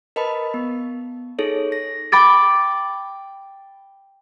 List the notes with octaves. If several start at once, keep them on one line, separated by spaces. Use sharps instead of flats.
A#4 B4 D#5 A5 B5
B3
D#4 G#4 A4 C#5
A#6
G5 B5 D6 A6 D7